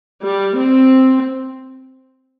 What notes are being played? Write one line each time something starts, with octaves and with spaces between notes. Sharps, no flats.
G3
C4